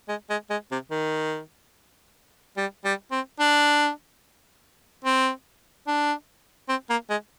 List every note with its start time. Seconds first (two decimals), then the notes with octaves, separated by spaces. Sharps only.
0.09 G#3
0.30 G#3
0.51 G#3
0.72 C3
0.91 D#3
2.57 G3
2.85 G3
3.12 C4
3.40 D4
5.05 C4
5.88 D4
6.69 C4
6.90 A#3
7.10 G#3